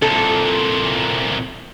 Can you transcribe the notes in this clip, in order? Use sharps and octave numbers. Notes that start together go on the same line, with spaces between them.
C2 A#2 A4